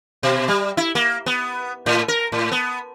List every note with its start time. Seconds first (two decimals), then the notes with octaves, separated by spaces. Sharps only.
0.23 B2
0.48 G3
0.77 E4
0.95 A#3
1.26 B3
1.86 A2
2.08 A#4
2.32 A2
2.52 B3